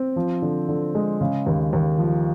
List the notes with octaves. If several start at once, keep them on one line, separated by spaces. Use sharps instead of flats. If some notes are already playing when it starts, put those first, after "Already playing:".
Already playing: C4
F3
D3
D3
G#3
C#3
D#2
D#2
F3